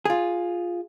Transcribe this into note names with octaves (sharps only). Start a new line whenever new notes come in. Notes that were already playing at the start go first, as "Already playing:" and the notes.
F4 G#4